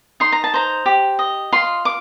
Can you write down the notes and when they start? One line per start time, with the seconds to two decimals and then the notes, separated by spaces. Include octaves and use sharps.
0.20 D#4 C6
0.32 A#5
0.44 A5
0.54 C5 A#5
0.86 G4
1.19 D#5
1.52 F4 C6
1.85 D6